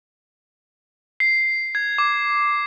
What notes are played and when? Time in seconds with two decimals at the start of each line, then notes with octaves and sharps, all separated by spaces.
1.20 C7
1.75 G#6
1.98 D6